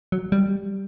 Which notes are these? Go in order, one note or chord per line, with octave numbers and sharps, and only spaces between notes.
F#3
G3